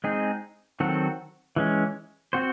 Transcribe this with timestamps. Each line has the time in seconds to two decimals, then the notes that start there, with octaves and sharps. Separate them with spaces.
0.04 G#3 C4 D#4 G#4
0.80 D#3 F#3 C4 F#4 A4
1.56 E3 G#3 C#4
2.33 C4 F#4 C5